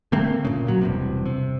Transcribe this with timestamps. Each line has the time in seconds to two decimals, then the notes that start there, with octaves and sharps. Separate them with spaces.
0.12 D3 A3 A#3 C4
0.45 A#2 C#3
0.67 A#2 F#3
0.81 E1 G2 C3
1.25 C3